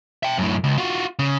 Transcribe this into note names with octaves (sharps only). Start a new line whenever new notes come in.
E5 G5
F#2 A2
C#2
F4 F#4
C#3